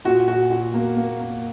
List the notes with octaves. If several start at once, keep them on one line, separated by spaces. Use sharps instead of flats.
A#2 F#4
A#2 F#4
A#2 F#4
A#3
A#3
A#3